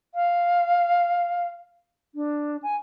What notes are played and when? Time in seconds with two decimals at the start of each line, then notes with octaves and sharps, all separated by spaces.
0.15 F5
2.15 D4
2.63 G#5